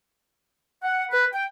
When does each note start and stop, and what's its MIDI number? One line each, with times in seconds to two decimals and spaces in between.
0.83 1.04 78
1.10 1.24 71
1.33 1.44 79